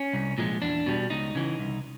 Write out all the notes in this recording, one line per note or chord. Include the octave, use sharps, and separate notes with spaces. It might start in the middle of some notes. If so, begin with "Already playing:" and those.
Already playing: C#4
C2
A#2 F3 G#3
E2 D4
B2 G3
C#2 D#4
C#3 E3
C2